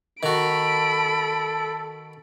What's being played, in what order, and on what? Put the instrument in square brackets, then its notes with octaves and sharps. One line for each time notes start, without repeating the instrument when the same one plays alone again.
[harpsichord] D#3 F#4 [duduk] A4 [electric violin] B5 D7